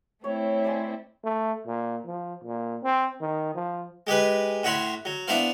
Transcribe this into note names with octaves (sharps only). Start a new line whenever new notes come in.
A3 C4 E4 C#5
D5 G#5 C6
A3
A#2
F3
A#2
C4
D#3
F3
G#3 G4 G#4 B4
A2 F#4 C#5 E5 B5 C6
F#3
B3 D4 E4 C5 F5